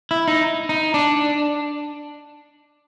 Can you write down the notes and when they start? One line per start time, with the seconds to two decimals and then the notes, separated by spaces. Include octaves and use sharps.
0.11 E4
0.28 D#4
0.69 D#4
0.94 D4